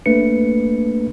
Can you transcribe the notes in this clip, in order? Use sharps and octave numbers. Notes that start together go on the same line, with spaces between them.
A3 A#3 D4 B4 C#7